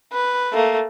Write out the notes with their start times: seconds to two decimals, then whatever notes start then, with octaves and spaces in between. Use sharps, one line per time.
0.13 B4
0.53 A3 A#3